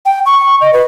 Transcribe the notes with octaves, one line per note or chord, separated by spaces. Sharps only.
G5
C#6
D#5
B4